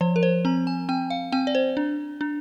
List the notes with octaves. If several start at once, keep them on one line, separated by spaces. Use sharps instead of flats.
F3 C5
A#4
C5
C4 A#5
G#5
C4 G5
F5
C4 G5
D5
C5
D4
D4